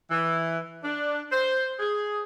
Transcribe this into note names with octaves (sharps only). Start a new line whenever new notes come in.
E3
D4
C5
G#4